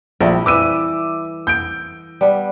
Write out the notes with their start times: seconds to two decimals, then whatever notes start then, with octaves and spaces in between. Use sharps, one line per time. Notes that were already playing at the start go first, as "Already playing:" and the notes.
0.21 A#1 G3 A3 E4
0.46 E3 B4 D6 E6 D#7
1.47 G6 D7
2.21 G3 B3 D4